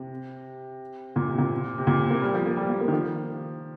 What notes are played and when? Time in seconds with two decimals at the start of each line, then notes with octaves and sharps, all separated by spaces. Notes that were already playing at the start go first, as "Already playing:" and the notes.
Already playing: C3
1.16 A#2
1.27 C3
1.38 A#2
1.78 C3
1.87 A#2
1.99 C3
2.11 A#3
2.22 G3
2.34 F3
2.46 A#3
2.57 G3
2.69 A#3
2.81 A#3
2.88 D#3
2.92 F3